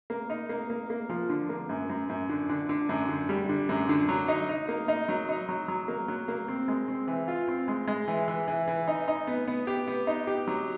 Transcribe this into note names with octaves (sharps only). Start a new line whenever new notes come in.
A#3
D#4
A#3
A#3
A#3
F3
D3
A#3
F#2
F#2
F#2
D3
D3
D3
F#2
D3
G3
D3
F#2
D3
F#3
D#4
D#4
A#3
D#4
F#3
D#4
F#3
F#3
A#3
F#3
A#3
C4
G#3
C4
E3
F4
C4
G#3
G#3
E3
E3
E3
E3
D#4
D#4
B3
B3
G4
B3
D#4
G4
F#3